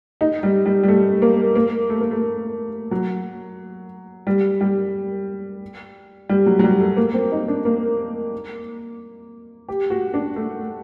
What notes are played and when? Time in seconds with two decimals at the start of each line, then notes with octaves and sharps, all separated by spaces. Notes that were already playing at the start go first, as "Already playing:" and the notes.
0.21 D#4
0.43 G3
0.66 G3
0.83 G3
0.88 A3
1.22 A#3
1.55 A#3
1.90 A3
2.01 A#3
2.11 A3
2.91 F#3
4.27 G3
4.61 G3
6.29 G3
6.46 F#3
6.59 F#3
6.64 G3
6.80 A3
6.97 A#3
7.14 C4
7.32 D#4
7.48 D4
7.65 A#3
9.69 G4
9.90 F#4
10.14 D4
10.36 A3